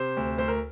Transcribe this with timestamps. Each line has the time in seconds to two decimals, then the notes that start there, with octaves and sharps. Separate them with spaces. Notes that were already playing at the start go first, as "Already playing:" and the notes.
Already playing: C3 C5
0.17 D2
0.38 D2 C5
0.48 A#4